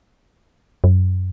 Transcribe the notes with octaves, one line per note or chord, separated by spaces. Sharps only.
F#2